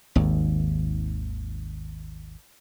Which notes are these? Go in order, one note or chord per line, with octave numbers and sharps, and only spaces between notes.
G#1 D#2